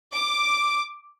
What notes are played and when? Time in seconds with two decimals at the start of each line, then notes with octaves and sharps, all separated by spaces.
0.13 D6